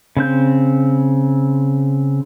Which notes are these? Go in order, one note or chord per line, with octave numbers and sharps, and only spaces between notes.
C#3 C4 G6